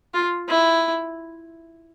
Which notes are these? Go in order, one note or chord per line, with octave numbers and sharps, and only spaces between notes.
F4
E4